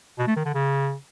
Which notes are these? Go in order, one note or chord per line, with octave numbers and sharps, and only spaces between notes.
B2
A3
D#3
D3
C#3